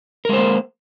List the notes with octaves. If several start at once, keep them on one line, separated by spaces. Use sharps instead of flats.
G#3 A#3 A#4 C5